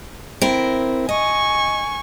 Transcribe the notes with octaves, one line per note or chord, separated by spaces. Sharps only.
C4 E4 A#4
D#5 G#5 C#6